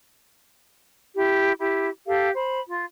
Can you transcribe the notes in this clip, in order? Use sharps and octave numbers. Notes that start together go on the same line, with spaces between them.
E4 G4
E4 G4
G4 A4 F5
C5 B5
F4